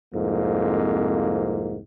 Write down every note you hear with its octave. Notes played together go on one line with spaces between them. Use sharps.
C2 F2 G#2 A#3